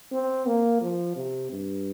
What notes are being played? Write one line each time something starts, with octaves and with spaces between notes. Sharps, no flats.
C4
A#3
F3
C3
G2